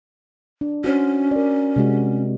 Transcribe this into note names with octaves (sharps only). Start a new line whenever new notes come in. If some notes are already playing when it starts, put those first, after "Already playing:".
D4
C#4 F#4 C5 C#5
A#4 D5
C3 G#3 F#4